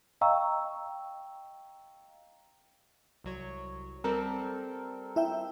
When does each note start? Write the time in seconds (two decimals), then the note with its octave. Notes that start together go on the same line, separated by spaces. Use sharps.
0.21 D#5 F5 G5 A#5 C#6 E6
3.24 C2 F#3 C#5
4.04 G3 C4 A4 A#4
5.16 E4 E5 G5